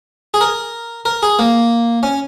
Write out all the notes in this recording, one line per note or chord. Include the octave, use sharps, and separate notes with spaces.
G#4
A#4
A#4
G#4
A#3
C#4